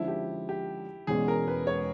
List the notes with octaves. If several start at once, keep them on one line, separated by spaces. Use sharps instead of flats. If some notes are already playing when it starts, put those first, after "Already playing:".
Already playing: D3 F3 G#3 C#4 E4
G4
G4
E1 E2 B2 G#3 C#4 G#4
A#4
B4
C#5